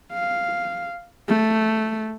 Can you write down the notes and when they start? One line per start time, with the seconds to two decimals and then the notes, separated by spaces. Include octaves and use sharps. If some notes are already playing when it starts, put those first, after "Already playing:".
0.13 F5
1.28 A3